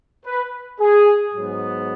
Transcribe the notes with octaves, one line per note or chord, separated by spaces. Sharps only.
B4
G#4
G#2 F#3 B3